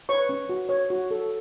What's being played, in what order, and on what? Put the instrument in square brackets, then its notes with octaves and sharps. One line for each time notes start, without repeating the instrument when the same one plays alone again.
[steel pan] B4 C#5 C#6
C#4
F#4
C#5
F#4
A4